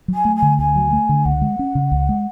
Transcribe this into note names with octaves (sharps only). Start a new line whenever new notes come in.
F#3
G#5
A3
G#5
D3
D2 G#5
F#3
A3
D3
C#2 F#5
G#3
C#4
C#3
C#2
G#3